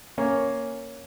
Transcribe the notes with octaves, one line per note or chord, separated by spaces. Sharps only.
A#3 C#4